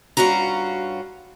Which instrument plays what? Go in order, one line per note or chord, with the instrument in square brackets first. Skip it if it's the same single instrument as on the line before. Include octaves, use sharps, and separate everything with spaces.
[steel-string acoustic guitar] G2 C#4 F4 F#4 A#5